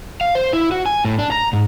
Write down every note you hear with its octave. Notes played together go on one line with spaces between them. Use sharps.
F5
C5
E4
F#4
G#5
A2
D4
A#5
G#2